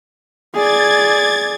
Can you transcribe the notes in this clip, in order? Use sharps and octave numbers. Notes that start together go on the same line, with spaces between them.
G#4 D5 G#6 A6